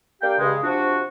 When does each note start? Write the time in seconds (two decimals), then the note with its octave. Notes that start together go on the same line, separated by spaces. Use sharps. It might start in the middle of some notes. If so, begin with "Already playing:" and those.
0.22 A#3 D4 G4 F5 G5
0.39 G2 C#3 G#3
0.63 C3 F3 D4 F4 F#4